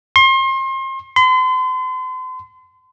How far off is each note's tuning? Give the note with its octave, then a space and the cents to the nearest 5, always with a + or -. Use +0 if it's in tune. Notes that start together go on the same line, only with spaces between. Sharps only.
C6 +35
C6 -40